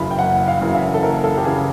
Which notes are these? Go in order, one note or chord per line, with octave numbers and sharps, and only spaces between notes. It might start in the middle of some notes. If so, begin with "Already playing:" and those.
Already playing: F#1 F#2 C#3 E3 B5
G5
F#1 F#5
F5
F#2 C#3 E3
E5
A4
F#1 A#4
A4
G4
C#3 E3 G#4